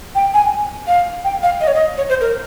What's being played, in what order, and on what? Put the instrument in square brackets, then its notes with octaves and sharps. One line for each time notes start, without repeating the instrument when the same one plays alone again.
[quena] G5
G#5
F5
G5
F5
D#5
C#5
D#5
C#5
C5
A#4